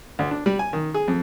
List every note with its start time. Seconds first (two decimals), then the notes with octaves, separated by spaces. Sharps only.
0.19 D2
0.31 D4
0.46 G3
0.59 G#5
0.73 D#3
0.94 G#4
1.08 F2